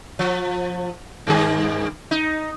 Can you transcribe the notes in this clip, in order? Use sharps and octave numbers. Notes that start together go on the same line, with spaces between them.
F3
G2 D#3 G#4
D#4